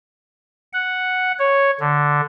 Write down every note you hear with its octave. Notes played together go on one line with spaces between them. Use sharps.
F#5
C#5
D3